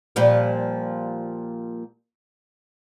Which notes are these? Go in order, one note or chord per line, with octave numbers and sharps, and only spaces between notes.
A#2 F3 G3